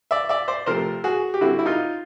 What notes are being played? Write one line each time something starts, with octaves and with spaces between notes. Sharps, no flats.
D5 E5
D5 E5
C5 D5
C3 F3 A3 C4 A#4 C5
F#4 G#4
G4
D3 G3 C4 E4 F#4
E4
D#4 F4